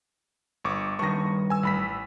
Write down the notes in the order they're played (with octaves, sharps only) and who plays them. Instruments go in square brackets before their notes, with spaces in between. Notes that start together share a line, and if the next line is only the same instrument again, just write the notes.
[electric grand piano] G1 C#6 D6
[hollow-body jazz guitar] G2 D#3 [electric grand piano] C#6 A#6
[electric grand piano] G#5 E6
A1 B5 B6